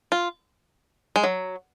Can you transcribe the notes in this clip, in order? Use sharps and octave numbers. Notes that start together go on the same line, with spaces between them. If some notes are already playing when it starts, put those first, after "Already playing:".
F4
G#3
F#3